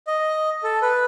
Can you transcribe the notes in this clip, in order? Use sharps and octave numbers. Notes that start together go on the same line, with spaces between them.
D#5
A4
B4